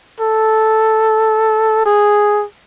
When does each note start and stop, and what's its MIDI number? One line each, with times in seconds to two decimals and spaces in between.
0.20 1.84 69
1.86 2.44 68